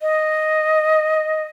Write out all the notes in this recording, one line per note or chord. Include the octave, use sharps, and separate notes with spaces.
D#5